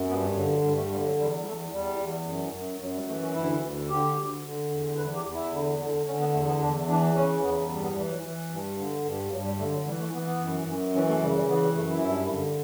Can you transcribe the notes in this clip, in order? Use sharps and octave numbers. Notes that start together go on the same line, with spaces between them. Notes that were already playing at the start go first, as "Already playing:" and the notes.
Already playing: F#2
G2 B3
D3 F#3
F#3
G2 G3
A3
D3 G3
F#3
E2 G3
G3
E2 A3
E2 G3
E2
F#2
F#2
F#2 F#3
G3
E3 A3
C#4
D2 E4
D2
D3 G4
D2
D3
E2
E2 B4
G4
E2
E4
D3
D3
D3 C#4
B3
E2 A3
B3
E2 D4
E3 D4
C#3 C#4
E2 B3
G2
B3
E3 G3
F#3
E3
G2
D3
G2
G2 F#3
G3
D3 A3
F#3
E3 G3
A3
E3 B3
B3
F#2
F#2
E3 C#4
A3
C#3 G3
G3
E3 B3
G3
F#2 A3
E4
G2
D3